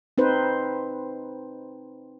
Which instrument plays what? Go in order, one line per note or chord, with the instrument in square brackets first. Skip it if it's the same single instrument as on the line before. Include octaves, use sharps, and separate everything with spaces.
[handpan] C4 D#4 B4 C5